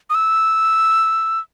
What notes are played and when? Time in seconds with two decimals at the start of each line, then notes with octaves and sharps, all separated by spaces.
0.10 D#6
0.15 E6